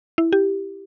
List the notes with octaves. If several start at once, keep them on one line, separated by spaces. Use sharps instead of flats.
E4
G4